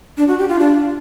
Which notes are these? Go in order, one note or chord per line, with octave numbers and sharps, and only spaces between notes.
D4
F#4
G4
F4
D4